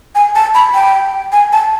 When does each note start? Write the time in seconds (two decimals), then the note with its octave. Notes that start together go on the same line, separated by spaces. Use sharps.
0.15 G#5
0.35 A5
0.55 B5
0.75 G5
1.32 G#5
1.52 A5